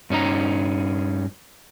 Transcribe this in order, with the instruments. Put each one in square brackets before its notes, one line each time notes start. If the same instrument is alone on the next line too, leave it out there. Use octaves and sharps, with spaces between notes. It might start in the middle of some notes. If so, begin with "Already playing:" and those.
[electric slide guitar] G2 C#4 D#4 A#5